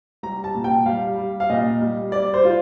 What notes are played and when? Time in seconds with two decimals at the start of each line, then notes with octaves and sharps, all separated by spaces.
0.23 G3 A#5
0.44 A5
0.55 A#2
0.64 G5
0.86 G3 F5
1.18 G3
1.40 F5
1.50 A#2 D#5
1.81 G3
2.12 G3 D5
2.34 C5
2.44 F4